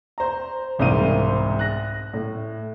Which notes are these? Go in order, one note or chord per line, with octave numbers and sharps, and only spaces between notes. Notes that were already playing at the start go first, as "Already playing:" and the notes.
C5 A#5
E1 C2 G#2 C5 F5 D#7
F#6 A#6
A2